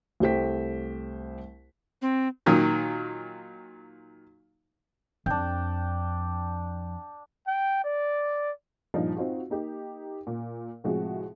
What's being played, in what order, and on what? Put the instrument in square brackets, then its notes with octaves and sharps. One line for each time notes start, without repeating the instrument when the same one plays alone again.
[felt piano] C2 A3 G4 C5 G5 B6
[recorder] C4
[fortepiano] A#2 D#3 F#3
[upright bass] F2 [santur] D4 G5
[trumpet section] G5
D5
[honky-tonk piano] G2 A#2 F3 D#4
C4 D#4 F4 F#4
A#3 D#4 G4
A#2
A2 C3 F3 G#3 F#4 G#4